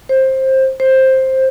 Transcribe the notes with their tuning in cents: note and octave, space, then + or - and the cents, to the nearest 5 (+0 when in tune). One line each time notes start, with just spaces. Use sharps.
C5 +15
C5 +10